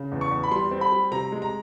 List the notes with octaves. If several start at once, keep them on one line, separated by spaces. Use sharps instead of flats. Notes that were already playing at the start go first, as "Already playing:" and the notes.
Already playing: C#3
E2
C#6
E2
B5
G3 C6
C4
B5
G3
C3 A#5
G#3
A#5